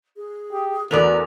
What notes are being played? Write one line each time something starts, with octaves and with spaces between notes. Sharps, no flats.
G#4
G4
E2 A3 B3 F#4 A#4 B4 D5 F7